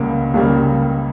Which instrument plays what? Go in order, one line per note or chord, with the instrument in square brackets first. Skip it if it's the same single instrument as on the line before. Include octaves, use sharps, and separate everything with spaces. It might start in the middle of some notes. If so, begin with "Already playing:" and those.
Already playing: [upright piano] C#2 C#3 G3 A#3 D7
C#2 C#3 G3 A#3